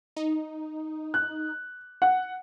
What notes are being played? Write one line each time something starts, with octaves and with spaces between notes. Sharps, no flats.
D#4
F#6
F#5